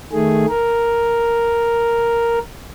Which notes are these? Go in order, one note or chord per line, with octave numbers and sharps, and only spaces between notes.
D#3 A3 G#4
A#4